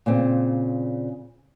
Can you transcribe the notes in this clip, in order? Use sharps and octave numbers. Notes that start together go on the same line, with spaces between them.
A#2 C#3 C4